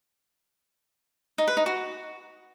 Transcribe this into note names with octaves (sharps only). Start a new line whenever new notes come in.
D#4
B4
D#4
F#4